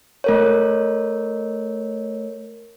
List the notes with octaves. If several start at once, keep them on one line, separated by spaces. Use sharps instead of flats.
A3 A#4 C#5